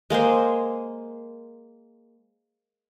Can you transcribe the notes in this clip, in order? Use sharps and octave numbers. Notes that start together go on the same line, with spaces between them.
G#3 A#3 G#4 C5